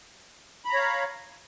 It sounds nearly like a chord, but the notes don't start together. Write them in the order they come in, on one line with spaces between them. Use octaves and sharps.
B5 A#5 C#5 F5